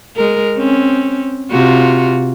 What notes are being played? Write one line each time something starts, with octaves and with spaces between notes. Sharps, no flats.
G#3 A#4
C4 C#4
C3 F4 F#4